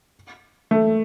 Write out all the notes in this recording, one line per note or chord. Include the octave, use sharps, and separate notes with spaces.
A3